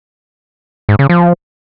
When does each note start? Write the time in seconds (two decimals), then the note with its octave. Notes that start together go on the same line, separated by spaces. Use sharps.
0.89 G#2
0.99 C#3
1.10 F3